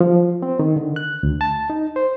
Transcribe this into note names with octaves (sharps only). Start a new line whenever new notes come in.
F3
C4
D#3
D3
F#6
D2
A5
D#4
C5